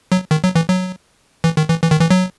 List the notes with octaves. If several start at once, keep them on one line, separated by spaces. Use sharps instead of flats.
F#3
D#3
F#3
E3
F#3
E3
D#3
E3
E3
D#3
E3
F#3